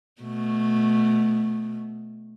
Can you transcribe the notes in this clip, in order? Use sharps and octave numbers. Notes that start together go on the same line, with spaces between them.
B2 A3